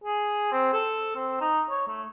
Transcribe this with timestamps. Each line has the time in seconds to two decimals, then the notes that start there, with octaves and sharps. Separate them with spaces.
0.04 G#4
0.52 C4
0.74 A4
1.16 C4
1.41 D#4
1.70 C#5
1.88 A3